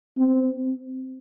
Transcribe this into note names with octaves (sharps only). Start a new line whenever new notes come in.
C4